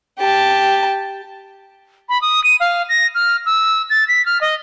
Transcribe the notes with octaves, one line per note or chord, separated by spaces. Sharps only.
G4 A5
B5
D#6
D#7
F5
A#6
F6
E6
A6
B6
F6
D#5